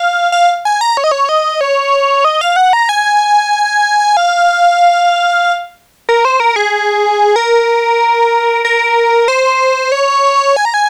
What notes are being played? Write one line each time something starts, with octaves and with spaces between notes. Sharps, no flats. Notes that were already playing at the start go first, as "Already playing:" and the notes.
Already playing: F5
F5
G#5
A#5
C#5
D#5
C#5
D#5
C#5
D#5
F5
F#5
A#5
G#5
F5
A#4
C5
A#4
G#4
A#4
A#4
C5
C#5
G#5
A#5
G#5